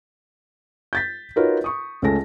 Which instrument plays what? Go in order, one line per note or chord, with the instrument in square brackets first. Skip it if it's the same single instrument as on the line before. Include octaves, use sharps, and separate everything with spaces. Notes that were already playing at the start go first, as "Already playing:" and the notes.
[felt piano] G6 A6 B6
D#4 F4 F#4 A#4 B4 C#5
C#6 D#6
C#2 A3 C#4 A5 A#6